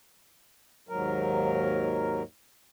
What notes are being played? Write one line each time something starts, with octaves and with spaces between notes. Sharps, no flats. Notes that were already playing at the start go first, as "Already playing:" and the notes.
D#2 G#2 F#3 A#4